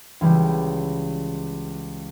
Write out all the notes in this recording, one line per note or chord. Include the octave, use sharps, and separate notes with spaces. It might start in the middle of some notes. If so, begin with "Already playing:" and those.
C#2 E3 G3 G4